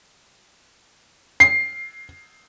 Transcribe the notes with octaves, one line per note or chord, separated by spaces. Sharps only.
C7